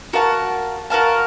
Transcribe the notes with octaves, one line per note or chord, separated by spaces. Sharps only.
F#4 A#4 F5 A5
F#4 A#4 F5 A5